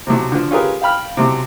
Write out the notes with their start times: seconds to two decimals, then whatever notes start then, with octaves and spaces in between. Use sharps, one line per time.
0.07 B1 C3
0.32 D3 F3
0.51 C#4 F4 G4 G#4 A#4 B4
0.82 F5 G5 B5 F6
1.17 B1 C3